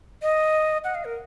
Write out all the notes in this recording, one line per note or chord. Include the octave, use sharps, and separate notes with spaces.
D#5
F#5
F5
A#4